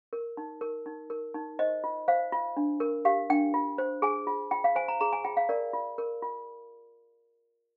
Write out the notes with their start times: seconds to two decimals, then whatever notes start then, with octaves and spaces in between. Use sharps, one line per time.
0.13 A#4
0.37 D#4
0.61 A#4
0.86 D#4
1.10 A#4
1.34 D#4
1.59 C5 D#5
1.84 F4
2.08 C5 F5
2.32 F4
2.57 D4
2.80 A#4
3.05 G4 F5
3.30 D4 G5
3.54 F4
3.78 C5
4.02 G#4 G#5
4.27 F4
4.51 F4 G5
4.64 F5
4.75 C5 G#5
4.88 A#5
5.01 G#4 A#5
5.13 G#5
5.24 F4 G5
5.37 F5
5.49 A#4 D5
5.73 F4
5.98 A#4
6.22 F4